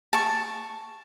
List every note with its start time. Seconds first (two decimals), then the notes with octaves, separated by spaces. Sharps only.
0.13 A5 C#6